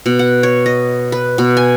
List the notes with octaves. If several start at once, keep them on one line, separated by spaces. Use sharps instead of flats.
B2
F#5
C#5
D#5
B4
B2
G#5